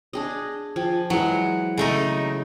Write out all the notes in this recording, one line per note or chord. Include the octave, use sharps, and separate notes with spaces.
D4 G#4 D#5
F3 G5 G#5
E3 F#3 G#3
C#3 A3 D#4